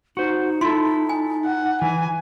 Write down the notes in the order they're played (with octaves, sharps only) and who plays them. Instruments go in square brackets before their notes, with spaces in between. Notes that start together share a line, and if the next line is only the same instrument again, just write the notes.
[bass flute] D#4 [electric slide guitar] F#4 C5
[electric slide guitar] E4 A4 [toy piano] F4 C6
[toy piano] G#5
[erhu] F#5
[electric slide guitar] E3 [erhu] G#5